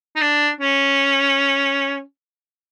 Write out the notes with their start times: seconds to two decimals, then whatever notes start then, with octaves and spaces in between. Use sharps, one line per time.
0.16 D#4
0.21 D4
0.61 C#4